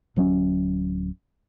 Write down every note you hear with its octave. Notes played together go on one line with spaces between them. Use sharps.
D1 F#3 C4 C#4